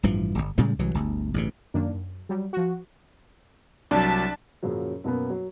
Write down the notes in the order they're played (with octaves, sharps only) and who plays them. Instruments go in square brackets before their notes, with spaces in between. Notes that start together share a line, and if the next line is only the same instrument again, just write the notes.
[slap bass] A1 G2 E3 F3
D1 G1
A2 C#3 G3 G#3
C2 E3 F#3
G1 D2
A1 G2 C#3
[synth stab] F#2 D#3 A#3 D4
F#2
F#3 G3
F3 F#4
[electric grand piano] C2 F#3 [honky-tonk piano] D4 [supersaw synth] A5 B6
[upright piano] F#2 A#2 C#3 F3 F#3
F#2 B2 A#3 B3
F#3